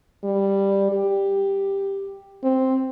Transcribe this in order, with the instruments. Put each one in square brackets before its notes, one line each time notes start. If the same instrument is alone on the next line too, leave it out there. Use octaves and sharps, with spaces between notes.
[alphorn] G3
G4
C4